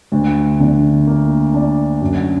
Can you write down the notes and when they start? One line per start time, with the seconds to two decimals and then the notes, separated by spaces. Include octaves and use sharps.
0.12 D2
0.60 D3
1.07 A#3
1.54 D4
2.01 F#2